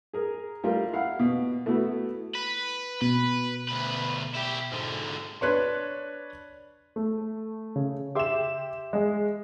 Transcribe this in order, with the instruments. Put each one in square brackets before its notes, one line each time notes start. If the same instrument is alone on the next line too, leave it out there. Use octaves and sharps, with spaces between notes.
[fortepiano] G#4 A#4
G3 A3 F4 A#4
E4 F5 F#5
B2
A3 B3 E4 F#4
[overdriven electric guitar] B4
[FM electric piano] B2 [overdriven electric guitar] B4
[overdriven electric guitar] D2 B4
E4 G4
G#2 D3
[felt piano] D4 B4 C#5 C6
[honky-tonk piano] A3
[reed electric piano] C#3
[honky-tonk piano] G4 E7 [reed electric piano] E5 C6 D6
[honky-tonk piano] G#3